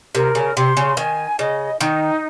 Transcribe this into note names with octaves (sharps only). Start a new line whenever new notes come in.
C3 A#4
C#3
C3 C6
C#3
D#3 G#5
C#3 D#5
D#3 D#4